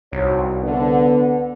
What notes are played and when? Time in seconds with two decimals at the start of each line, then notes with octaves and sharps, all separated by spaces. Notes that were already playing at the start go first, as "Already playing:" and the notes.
0.13 C2 D#4 F#4 C#5
0.63 D3 B3